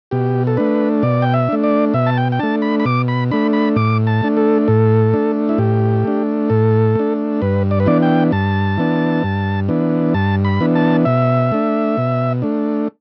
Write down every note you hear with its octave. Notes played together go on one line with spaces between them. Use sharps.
B2 G4
A4
A3 D4 B4
B2 D5
G5
E5
A3 D4
D5
B2 E5
A5
G5
G5
A3 D4 A5
B5
B5
B2 D6
B5
A3 D4 B5
B5
A2 D6
A5
A3 D4
A4
A2 A4
A3 D4
E4
A2 G4
A3 D4
A2 A4
A3 D4
G2 B4
D5
B4
E3 B3 D4 D5
G5
G2 A5
E3 B3 D4
G2
E3 B3 D4
G2 A5
B5
E3 B3 D4
A5
B2 E5
A3 D4
B2
A3 D4